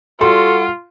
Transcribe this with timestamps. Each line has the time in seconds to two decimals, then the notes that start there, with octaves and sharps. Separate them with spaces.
0.21 G3 F4 F#4 A4 C6